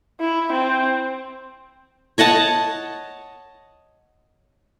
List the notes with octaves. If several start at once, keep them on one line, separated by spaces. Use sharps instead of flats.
E4
C4
C#5 D#5 F#5 A5